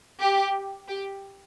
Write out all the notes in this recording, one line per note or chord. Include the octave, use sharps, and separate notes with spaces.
G4
G4